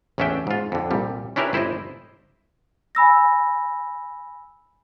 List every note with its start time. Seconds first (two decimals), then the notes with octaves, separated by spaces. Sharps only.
0.18 A1 E2 C#4 D4 E5 G5
0.47 G#2 F4
0.72 F2 D3
0.91 C2 A#2 G3
1.36 C#4 D4 E4 G4 A#4 B4
1.53 G1 E4 C5 D5 D#5
2.95 G#5 B5 E6 A#6